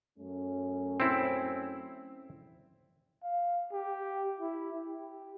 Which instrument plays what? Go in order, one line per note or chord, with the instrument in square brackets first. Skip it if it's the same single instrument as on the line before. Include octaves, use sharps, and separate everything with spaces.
[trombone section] F#2 A3 C#4
[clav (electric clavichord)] C4 E4
[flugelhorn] F5
G4
E4
G4